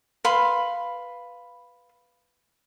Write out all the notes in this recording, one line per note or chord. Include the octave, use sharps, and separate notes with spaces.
B4 F5 B5 C6